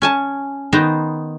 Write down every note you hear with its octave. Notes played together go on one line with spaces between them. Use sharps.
C#4 G#5 A5
D#3 B3 D#4 C5 A#5